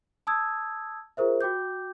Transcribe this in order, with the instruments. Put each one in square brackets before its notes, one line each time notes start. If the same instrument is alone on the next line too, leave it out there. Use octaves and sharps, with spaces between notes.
[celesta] A5 D#6 E6 G#6
F4 G#4 A#4 C5 E5
F#4 G5 D6 G6